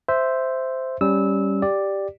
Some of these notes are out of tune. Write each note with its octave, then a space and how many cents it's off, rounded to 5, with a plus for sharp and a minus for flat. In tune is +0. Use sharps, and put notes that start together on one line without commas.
C5 -5 E5 +0
G3 +0 C#4 +0 E6 -20
G4 +0 D5 +5